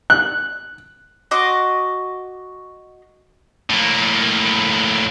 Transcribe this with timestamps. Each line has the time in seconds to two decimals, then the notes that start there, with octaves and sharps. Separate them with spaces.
0.10 F#6
1.31 F#4 D#5 C6 D6
3.70 A2 A#3